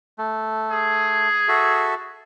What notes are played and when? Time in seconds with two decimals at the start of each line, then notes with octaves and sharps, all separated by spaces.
0.18 A3
0.71 G#4
1.48 F#4 A4 E5